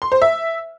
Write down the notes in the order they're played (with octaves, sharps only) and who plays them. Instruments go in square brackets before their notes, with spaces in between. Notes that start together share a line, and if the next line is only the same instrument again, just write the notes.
[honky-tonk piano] C6
C5
E5